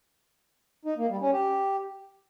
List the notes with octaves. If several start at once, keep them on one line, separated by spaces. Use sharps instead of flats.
D#4
A#3
G3
C#4
G4